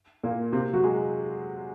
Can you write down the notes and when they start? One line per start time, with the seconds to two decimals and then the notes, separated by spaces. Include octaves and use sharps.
0.24 A#2 A#3
0.53 C3 C4
0.73 F#3 F#4
0.84 G#3 G#4